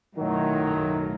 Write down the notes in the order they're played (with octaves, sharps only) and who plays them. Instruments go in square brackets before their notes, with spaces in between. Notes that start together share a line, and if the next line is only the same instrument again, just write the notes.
[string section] B1 F#2 A2 [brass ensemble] D#3 F#3